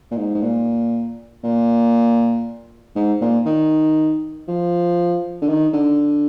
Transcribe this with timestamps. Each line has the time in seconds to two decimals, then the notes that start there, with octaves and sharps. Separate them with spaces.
0.11 A#2
0.17 G#2
0.34 G#2
0.42 A#2
1.44 A#2
2.95 G#2
3.21 A#2
3.46 D#3
4.48 F3
5.42 D3
5.49 D#3
5.74 D3